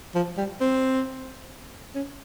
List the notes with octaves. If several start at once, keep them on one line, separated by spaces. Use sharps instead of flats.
F3
G3
C4
C#4